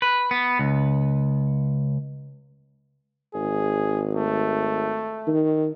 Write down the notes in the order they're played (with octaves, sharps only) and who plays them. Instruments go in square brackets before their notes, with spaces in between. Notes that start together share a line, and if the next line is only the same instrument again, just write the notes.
[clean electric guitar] B4
B3
C#2
[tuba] G#1 [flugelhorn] G#4
[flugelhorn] A3
[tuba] D#3